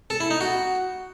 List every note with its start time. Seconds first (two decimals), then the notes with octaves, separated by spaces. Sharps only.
0.10 A4
0.20 E4
0.31 D#4
0.41 F#4